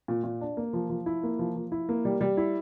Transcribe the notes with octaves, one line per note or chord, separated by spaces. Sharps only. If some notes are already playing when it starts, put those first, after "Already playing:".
A#2
A#2
D4
A#3
F3
F3
E4
A#3
F3
F3
E4
A#3
G3
G3
E4